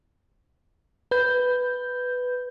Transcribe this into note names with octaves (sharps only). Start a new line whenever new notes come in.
B4 G6